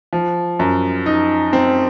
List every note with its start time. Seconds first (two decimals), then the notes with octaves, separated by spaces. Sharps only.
0.13 F3
0.59 F#2
1.06 D#4
1.53 C4